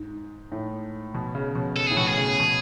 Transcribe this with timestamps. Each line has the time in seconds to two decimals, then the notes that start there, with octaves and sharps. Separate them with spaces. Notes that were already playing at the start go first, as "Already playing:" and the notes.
Already playing: G#2
0.52 A2
1.14 B2
1.35 C#3
1.55 B2
1.76 A4
1.87 A2 G#4
1.97 B2 F#4
2.07 G#4
2.18 C#3
2.40 B2